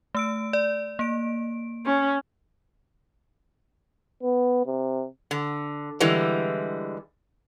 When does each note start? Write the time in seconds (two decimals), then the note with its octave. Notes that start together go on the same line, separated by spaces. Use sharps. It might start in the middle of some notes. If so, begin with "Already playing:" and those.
0.15 A3 E6 D7
0.53 D5
0.99 A#3 D7
1.86 C#4
4.23 B3
4.66 C3
5.31 D3
6.00 D3 E3 G3 G#3